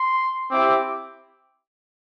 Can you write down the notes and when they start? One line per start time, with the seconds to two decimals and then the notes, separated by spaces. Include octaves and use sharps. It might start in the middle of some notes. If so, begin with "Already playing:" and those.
Already playing: C6
0.51 C4 E4 G4 D6